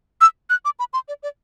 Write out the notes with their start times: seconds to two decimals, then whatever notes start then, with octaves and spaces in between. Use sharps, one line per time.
0.21 E6
0.50 F#6
0.65 D6
0.79 B5
0.93 C6
1.08 D5
1.23 D5